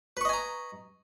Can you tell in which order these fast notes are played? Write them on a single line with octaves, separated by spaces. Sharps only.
B4 C#6 D#5 G#5 A#5